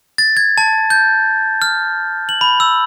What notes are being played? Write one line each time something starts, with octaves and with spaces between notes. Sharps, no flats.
A6
G#6
A5
G6
F6
F#7
B5
E6